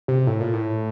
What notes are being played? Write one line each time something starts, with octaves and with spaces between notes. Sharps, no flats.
C3
A2
A#2
A2